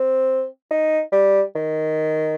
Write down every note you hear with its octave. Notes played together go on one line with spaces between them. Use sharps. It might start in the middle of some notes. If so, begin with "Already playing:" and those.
Already playing: C4
D#4
G3
D#3